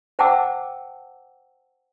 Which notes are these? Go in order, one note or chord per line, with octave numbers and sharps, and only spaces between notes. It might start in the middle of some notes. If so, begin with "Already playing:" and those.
C5 F#5 G5 A5 D6 E6